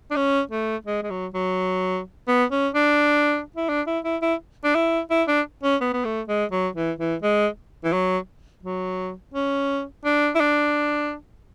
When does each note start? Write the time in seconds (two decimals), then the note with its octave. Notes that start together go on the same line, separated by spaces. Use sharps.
0.11 D4
0.16 C#4
0.51 A3
0.87 G#3
1.03 G#3
1.10 F#3
1.34 F#3
2.28 B3
2.52 C#4
2.75 D4
3.56 E4
3.69 D4
3.87 E4
4.04 E4
4.22 E4
4.64 D4
4.75 E4
5.10 E4
5.28 D4
5.63 C#4
5.81 B3
5.93 B3
6.05 A3
6.28 G#3
6.52 F#3
6.75 E3
6.99 E3
7.22 G#3
7.84 E3
7.93 F#3
8.63 F#3
9.34 C#4
10.05 D4
10.35 E4
10.40 D4